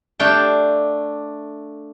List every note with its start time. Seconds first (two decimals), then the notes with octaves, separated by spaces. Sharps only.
0.19 A3 D4 F5 G5 A5